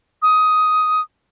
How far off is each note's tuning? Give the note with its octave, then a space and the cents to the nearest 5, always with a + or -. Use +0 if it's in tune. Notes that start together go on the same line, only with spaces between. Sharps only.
D#6 +10